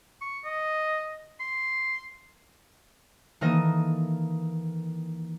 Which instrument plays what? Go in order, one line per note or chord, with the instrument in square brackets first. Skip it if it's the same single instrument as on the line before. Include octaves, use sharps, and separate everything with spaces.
[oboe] C#6
D#5
C6
[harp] D#3 E3 A#3 A4 D#5